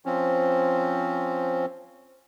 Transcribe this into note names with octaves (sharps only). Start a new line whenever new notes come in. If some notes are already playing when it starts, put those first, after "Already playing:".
F3 C4 C#4